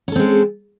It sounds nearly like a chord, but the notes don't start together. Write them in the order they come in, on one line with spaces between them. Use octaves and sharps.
C#4 A4 C4 G#3